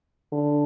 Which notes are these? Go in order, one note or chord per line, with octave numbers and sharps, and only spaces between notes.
D3